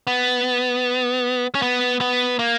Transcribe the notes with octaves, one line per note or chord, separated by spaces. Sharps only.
B3
C#4
B3
B3
A#3